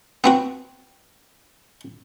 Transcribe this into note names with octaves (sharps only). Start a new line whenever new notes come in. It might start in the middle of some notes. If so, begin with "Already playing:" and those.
B3 C4 F#4